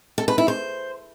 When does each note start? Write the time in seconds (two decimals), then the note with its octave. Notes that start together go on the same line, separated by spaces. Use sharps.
0.18 A4
0.28 B4
0.38 E4
0.48 C5